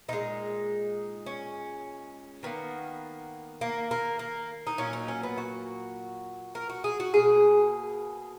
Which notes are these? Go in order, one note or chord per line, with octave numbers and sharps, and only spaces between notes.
A#2 G#3 D#4
C#4
D#3 A#3 B3
A#3
A#3
A#3
D#4
A#2 F#3 A#3 C#4
D#4
C#4
B3
F#4
A#4
F#4
G#4
F#4
B2 A#3 G#4